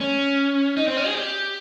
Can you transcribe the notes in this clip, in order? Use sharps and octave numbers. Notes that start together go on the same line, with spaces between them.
C#4
D#4
C4
C#4
G#4
G4